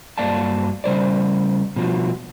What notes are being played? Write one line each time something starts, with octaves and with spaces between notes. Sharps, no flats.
G2 F#3 A#3 D5 F5 A5
C#3 G3 C5 D5
B2 F3 F#3